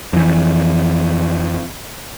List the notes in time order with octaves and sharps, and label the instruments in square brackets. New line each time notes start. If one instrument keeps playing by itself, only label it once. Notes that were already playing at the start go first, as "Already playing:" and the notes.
[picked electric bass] F2 E3